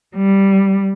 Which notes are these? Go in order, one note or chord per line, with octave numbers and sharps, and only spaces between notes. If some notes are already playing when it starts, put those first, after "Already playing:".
G3